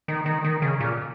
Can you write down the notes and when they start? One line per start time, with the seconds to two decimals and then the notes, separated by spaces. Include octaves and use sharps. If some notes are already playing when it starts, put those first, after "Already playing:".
0.08 D#3
0.26 D#3
0.44 D#3
0.62 C#3
0.80 A#2